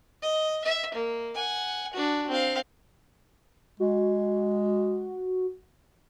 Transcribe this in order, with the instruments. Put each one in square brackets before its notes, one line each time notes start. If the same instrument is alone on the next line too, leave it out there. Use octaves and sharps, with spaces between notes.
[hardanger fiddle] D#5
E5
A#3
F#5 G#5
D4 F#4
C4 F5
[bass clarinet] G#3 [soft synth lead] F#4